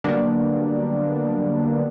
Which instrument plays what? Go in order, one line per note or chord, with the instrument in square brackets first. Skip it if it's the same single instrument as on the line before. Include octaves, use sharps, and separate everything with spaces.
[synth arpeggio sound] D3 F#3 G3 A#3 B3 D4